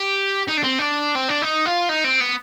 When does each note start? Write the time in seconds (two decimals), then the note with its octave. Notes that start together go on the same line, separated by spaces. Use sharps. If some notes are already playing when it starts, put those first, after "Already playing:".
Already playing: G4
0.48 D#4
0.58 D4
0.64 C4
0.79 D4
1.15 C4
1.29 D4
1.42 D#4
1.66 F4
1.89 D#4
2.04 C4
2.20 B3